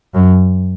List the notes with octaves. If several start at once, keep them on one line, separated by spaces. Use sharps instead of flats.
F#2